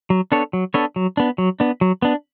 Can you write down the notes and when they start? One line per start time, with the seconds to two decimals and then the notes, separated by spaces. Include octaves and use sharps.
0.10 F#3
0.32 B3 D4 A4 C#5
0.53 F#3
0.74 B3 D4 A4 C#5
0.96 F#3
1.17 B3 D4
1.38 F#3
1.60 B3 D4
1.81 F#3
2.02 B3 D4